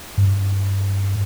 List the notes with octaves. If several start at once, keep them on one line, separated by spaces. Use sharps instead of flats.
G2